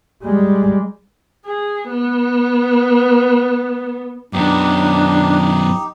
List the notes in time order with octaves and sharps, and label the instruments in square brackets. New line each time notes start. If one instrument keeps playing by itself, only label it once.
[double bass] G3 G#3
[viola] G#4
B3
[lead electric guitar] F#2 B3 [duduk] D4 [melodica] D#4 G4